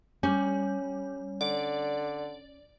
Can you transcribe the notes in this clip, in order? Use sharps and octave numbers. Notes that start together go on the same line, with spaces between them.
G3 C#4
D3 D5